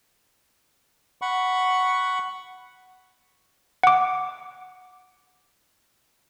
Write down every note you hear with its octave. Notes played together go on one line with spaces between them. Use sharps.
F#5 B5 C#6
F#5 D6